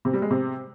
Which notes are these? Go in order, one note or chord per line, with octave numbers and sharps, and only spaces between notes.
C3
G3
G#3
C3